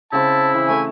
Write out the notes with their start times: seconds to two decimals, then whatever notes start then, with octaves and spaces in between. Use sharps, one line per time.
0.13 C#3 C4 E4 A5
0.54 E3
0.68 A3 C4 G#5